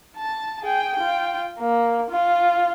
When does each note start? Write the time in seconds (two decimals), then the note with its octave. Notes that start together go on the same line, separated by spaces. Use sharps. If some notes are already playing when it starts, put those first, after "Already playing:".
0.17 A5
0.62 G#4 G5
0.96 F4 G5
1.59 A#3
2.11 F4